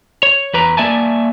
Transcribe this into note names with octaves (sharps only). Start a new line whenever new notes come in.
C#5
E2 B4 A#5
A#3 D5 E5 G#5 A5